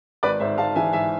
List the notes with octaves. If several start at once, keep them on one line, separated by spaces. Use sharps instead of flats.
G#1 B4 D5
G#2 C5 E5
G#2 F5 A5
E3 E5 G#5
G#2 E5 G#5